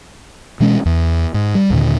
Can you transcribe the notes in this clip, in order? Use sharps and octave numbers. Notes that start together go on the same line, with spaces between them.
B2 E3 G#3 C#4
E2
G#2
G3
D#2 A#2 D3